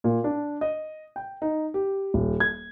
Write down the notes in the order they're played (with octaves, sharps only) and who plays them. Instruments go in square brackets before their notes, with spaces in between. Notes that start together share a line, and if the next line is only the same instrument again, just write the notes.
[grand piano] A#2
D4
D#5
G5
D#4
G4
D#1
G#6